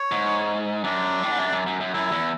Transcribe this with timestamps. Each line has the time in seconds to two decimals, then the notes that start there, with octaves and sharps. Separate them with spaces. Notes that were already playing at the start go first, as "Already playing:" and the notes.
Already playing: C#5
0.12 G#2
0.84 F#2 D4
1.23 A2
1.31 G#2
1.39 F#2
1.52 F#2
1.66 F#2
1.80 F#2
1.94 F#2 E4
2.12 E2